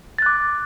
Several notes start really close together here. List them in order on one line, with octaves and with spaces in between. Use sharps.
A6 F#6 D6